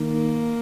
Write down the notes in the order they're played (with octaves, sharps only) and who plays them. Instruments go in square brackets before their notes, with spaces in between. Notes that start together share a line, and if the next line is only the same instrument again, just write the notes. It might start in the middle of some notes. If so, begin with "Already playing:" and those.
Already playing: [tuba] D#3 [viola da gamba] A#3